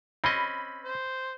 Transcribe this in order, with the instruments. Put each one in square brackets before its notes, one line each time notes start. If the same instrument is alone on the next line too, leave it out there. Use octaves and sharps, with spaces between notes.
[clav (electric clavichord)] C4 C#4 D#5 [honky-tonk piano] B5
[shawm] C5